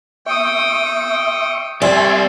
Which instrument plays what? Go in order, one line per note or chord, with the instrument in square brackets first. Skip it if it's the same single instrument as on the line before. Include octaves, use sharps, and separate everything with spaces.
[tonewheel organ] E5 C#6 [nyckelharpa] G5 D#6
[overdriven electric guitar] G3 C4 [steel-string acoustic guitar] D5 [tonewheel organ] E5 G#5 C6